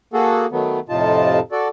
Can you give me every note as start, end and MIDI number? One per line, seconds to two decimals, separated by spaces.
0.13 0.46 58
0.13 0.46 66
0.13 0.46 68
0.13 0.46 69
0.52 0.79 51
0.52 0.79 54
0.52 0.79 57
0.52 0.79 59
0.89 1.40 41
0.89 1.40 45
0.89 1.40 48
0.89 1.40 63
0.89 1.40 65
0.89 1.40 81
1.52 1.68 66
1.52 1.68 69
1.52 1.68 74